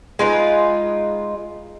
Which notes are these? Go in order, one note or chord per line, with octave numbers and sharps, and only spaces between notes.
G#3 D#4 F4 B4